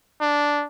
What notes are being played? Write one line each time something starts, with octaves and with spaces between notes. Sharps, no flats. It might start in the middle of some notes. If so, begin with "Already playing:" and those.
D4